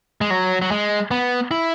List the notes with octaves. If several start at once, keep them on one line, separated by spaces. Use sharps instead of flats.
G#3
F#3
F#3
G#3
B3
E4